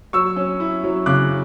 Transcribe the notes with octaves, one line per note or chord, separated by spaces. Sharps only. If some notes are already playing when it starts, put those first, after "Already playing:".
F#3 C#6 E6
C#4
E4
F#3
C#3 D6 F#6